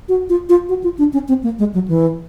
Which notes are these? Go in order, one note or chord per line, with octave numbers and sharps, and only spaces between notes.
F#4
F4
F4
F#4
F4
D4
C#4
C4
A#3
G#3
F#3
E3